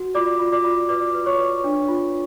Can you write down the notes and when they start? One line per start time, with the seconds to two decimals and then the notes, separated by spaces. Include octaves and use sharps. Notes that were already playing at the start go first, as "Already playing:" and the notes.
Already playing: F#4
0.15 F4 D5 D6
0.39 F4
0.52 D5 D6
0.64 F4
0.89 B4 D5 D6
1.15 B4
1.26 C#5 C#6
1.39 B4
1.64 D4
1.88 F4